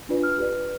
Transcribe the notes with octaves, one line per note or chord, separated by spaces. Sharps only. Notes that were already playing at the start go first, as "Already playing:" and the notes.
D4 F4 B4 D5
F6
G4 B4 D5